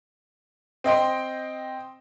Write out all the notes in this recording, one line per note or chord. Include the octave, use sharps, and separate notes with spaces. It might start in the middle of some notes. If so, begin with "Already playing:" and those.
C4 D#5 G5 C6